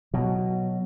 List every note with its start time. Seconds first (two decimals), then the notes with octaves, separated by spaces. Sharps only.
0.14 B2 F#3